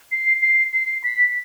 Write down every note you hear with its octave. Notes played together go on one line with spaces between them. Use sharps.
C7
C7
C7
B6